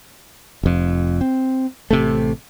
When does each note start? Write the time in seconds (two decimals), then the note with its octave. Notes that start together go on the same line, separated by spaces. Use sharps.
0.63 F1 F2
1.21 C4
1.91 A1 C3 A3